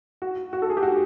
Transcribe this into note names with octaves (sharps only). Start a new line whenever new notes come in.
F#4
F#4
A4
G#4
G4
F#4